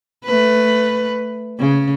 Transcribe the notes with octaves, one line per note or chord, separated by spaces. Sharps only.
A3 B4
C#3